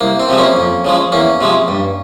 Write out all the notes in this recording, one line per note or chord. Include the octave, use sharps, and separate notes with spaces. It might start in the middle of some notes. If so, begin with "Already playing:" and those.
C2 A#3
C4
C3 F3 G#3
A#3 C#4
F2
C#3 F3 G#3
E2 A#3 C#4
C3 F3 G#3
G2